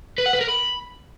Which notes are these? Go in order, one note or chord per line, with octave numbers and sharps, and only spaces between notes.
B4
F#5
B4
A#4
B5